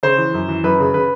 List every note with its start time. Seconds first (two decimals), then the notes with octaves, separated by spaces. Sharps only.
0.03 C#3 C5
0.18 E3
0.34 F#2
0.48 E3
0.64 F#2 B4
0.80 C#3
0.94 C#3 B4